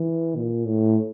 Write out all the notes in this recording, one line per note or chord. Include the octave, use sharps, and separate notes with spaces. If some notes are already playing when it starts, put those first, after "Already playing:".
Already playing: E3
A#2
A2